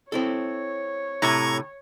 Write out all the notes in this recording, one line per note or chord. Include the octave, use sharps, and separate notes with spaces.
C4 E4 A4 C#5
A2 C3 A#5 C#6 G#6